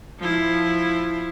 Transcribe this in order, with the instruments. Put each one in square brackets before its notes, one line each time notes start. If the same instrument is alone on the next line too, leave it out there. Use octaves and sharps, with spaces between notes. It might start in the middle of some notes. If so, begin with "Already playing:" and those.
[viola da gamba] F3 E4